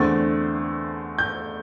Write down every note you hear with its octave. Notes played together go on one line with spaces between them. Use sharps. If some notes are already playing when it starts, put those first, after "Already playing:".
Already playing: E2 D3 A3 C4 A6
G6